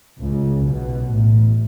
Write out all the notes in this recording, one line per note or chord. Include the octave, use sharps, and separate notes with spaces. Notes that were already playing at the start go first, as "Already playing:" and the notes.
C#2 C#3
B1 B2
A1 A2